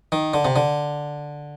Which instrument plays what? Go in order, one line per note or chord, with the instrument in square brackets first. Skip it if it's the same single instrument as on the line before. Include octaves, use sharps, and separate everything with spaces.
[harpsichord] D#3
D3
C3
D3